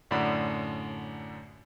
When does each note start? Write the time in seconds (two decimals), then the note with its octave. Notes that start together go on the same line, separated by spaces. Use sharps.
0.11 F#2 A2 D3 D5 F#5 B5